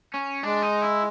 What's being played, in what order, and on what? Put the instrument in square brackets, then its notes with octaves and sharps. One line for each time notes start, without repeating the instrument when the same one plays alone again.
[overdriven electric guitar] C#4
[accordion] G#3 [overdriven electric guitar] D4
[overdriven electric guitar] D#4
E4